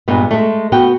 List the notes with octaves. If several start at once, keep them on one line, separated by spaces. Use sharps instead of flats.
G2 A#2 G#3 B3
G#3 A3
B3 F#4 G5